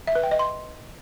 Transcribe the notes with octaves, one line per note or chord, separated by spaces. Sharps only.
E5
B4
G5
D#5
C6